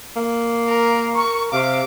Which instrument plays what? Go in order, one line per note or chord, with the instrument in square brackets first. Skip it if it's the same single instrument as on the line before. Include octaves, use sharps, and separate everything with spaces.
[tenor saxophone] A#3
[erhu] A#4
[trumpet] A#4 [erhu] C#6
[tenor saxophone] C3 [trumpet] F5 [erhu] D6